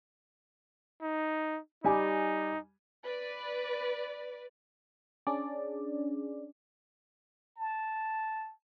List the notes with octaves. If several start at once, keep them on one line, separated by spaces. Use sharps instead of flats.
D#4
G3 D#4 G#5 D6
B4 D5
C#4 D4 G#4 D5
A5